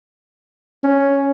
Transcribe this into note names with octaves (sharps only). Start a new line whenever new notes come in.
C#4